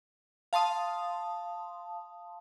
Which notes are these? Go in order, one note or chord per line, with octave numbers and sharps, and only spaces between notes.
F5 A5 C6 D#6